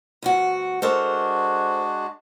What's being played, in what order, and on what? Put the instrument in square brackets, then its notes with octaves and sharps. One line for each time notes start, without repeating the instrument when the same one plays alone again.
[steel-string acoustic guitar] D2 G2 F#4
[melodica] G#3 D4 F#4 [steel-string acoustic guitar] A4 A#4 C5